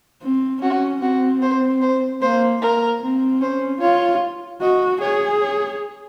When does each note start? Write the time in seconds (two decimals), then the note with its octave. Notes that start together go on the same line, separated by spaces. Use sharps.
0.23 C4
0.62 C#4 F#4
1.02 C4 F#4
1.42 C5
1.82 C5
2.22 A#3 C5
2.62 A#3 A#4
3.02 C4
3.41 C#4 C5
3.81 F4 C#5
4.62 F#4 D#5
5.01 G#4 C#5
5.41 C#5